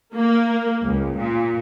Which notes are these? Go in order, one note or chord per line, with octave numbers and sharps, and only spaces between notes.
A#3
C#2
A#2